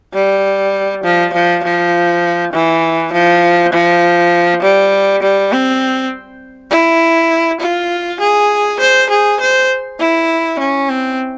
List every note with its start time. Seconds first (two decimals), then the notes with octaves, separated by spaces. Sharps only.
0.14 G3
1.04 F3
1.33 F3
1.64 F3
2.53 E3
3.13 F3
3.73 F3
4.62 G3
5.22 G3
5.52 C4
6.71 E4
7.60 F4
8.20 G#4
8.80 C5
9.10 G#4
9.40 C5
9.99 E4
10.59 C#4
10.89 C4